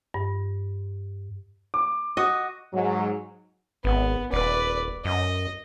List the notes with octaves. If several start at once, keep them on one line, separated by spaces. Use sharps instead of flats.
G2
D6
F#4 D#5
G#2 F#3
G#1 B3
D#1 B4 D5
F#2 D#5